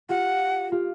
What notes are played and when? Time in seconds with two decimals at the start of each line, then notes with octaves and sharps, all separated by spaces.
0.09 F4 G4 F#5
0.72 F4 G4